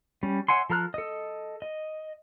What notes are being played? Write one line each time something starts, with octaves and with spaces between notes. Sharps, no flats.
G3 C#4
C#5 E5 F#5 G#5 C6
F3 A4 A#5 F6 F#6
A4 D#5
D#5